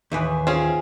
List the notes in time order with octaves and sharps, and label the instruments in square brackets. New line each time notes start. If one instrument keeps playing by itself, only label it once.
[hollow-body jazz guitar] D#2 [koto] A2 E3 B4 [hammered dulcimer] G#4 E5
[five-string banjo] C4 C#4 G#4 [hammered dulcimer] F4